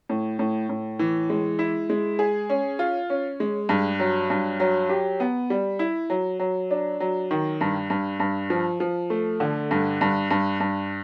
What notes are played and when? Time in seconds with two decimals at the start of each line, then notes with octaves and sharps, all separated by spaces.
0.09 A2
0.39 A2
0.69 A2
0.99 E3
1.30 G#3
1.59 E4
1.90 G#3
2.19 G#4
2.50 C#4
2.79 F4
3.10 C#4
3.40 G#3
3.69 G2
4.00 F#3
4.30 G2
4.60 F#3
4.89 G4
5.20 B3
5.50 G3
5.79 E4
6.10 F#3
6.40 F#3
6.71 D4
7.00 F#3
7.31 D#3
7.61 G2
7.90 G2
8.20 G2
8.50 F3
8.80 F3
9.10 A3
9.40 D3
9.71 G2
10.01 G2
10.31 G2
10.60 G2